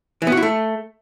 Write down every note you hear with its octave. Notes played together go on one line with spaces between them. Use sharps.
E3
B3
F#4
E4
A3